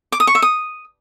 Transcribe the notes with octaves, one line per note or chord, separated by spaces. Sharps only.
D6
D#6
C#6
E5
D#6